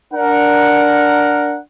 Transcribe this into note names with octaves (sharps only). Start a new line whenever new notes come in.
D4 A#4 F#5